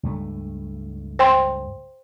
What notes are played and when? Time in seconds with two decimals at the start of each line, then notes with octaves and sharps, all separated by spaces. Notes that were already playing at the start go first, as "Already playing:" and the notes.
0.03 C#2 G2 A3
1.19 C5 G5 C6